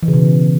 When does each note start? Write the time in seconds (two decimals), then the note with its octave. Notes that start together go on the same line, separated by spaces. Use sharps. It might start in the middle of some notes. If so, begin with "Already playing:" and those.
0.03 E3
0.08 C#3
0.14 B2